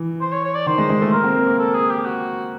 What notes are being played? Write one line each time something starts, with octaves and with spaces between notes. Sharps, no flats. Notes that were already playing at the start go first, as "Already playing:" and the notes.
Already playing: E3
C5
C#5
C#5
D5
D#3 C5
G#3
G#3
A3
A#3 A#4
C4
A#3
A#3
A4
G#4
G4
F#4